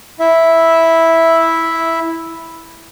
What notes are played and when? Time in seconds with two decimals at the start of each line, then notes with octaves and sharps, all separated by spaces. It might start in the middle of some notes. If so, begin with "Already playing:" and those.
0.20 E4 E5